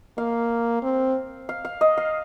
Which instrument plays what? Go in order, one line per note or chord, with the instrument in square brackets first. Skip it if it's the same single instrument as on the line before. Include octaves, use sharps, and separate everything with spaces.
[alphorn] A#3 [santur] F5
[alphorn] C4
[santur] F5
F5
D#5
F5